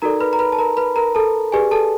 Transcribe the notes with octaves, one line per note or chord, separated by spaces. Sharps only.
D#4 F#4 A4 A#4 D5 A#5
B4 B5
A#5
B4 B5
A5
A#4 A#5
B4 B5
A#4 A#5
A4 A5
G4 G#4 B4 D5 G#5
A4 A5